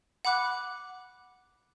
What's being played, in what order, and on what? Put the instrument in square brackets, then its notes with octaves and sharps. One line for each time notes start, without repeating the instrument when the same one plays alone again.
[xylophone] F#5 B5 D6 F#6